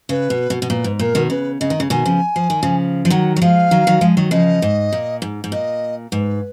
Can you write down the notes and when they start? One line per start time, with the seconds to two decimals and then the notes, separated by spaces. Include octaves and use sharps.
0.09 C#3 B4
0.30 B2
0.50 B2
0.62 B2
0.70 A#2 B4
0.84 G#2
0.99 A#2 A#4
1.15 B2 D#3
1.30 C#3 B4
1.60 C#3 D#5
1.70 D#3
1.80 C#3
1.90 B2 D#3 G#5
2.06 C#3 F3
2.36 F3
2.50 D#3
2.63 C#3 F3
3.05 F3
3.10 D#3 F#3 F#5
3.36 F#3
3.41 F3 G#3 F5
3.71 D#3 F#3
3.87 D#3 F#3
4.01 F3 G#3
4.17 D#3 F#3
4.31 C#3 F3 D#5
4.62 G#2
4.92 A#2
5.22 G#2
5.44 G#2
5.52 A#2 D#5
6.12 G#2 B4